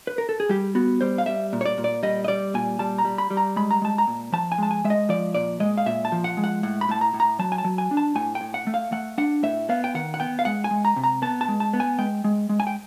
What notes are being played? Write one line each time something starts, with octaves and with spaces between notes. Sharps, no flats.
B4
A#4
A4
G#4
G3 G4
B3 F#4
G3 C5
F5
G3 E5
A#2
C#5
D5
A#2
D5
G3 D#5
D#5
G3 D5
A#2 G#5
G3 A5
A#5
G3
B5
G3
A#5
G#3 B5
A#5
G#3 A5
A#5
A#2
F3 A5
G#5
G#3 A5
G#5
G#3 E5
D#5
F3 D5
A#2 D5
G#3 D#5
F5
A#2 E5
A5
F3
F#5
G#3
F#5
A2 F#5
B5
A2 A5
A#5
A2
A#5
F#3 A5
G#5
A5
F#3
G#5
D4
A5
A2 G#5
G5
A2
F#5
A3
F5
A3 F#5
D4 F#5
A2 E5
B3 F5
G5
D#3 F#5
F#5
B3 G5
F5
G#3 F#5
G#5
G#3
A#5
C3
A#5
B3 A5
A5
G#3
A5
B3
G#5
G#3 G5
G#3
G#3
G#5
G5